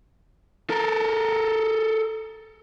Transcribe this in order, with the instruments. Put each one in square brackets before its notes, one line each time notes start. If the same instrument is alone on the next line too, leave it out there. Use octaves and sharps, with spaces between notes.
[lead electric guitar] A4 A#4